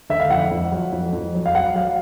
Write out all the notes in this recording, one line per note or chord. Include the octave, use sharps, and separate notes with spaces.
D3 E5
F5
F2 F#5
F2
F#3
F2
F2
F#3
F5
F#3 F#5
F#3 F5